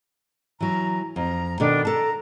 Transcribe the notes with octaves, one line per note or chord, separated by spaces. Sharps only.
E3 F#3 A#5
F2 A#5
B2 D#3 D4 A4
A4 A5 A#5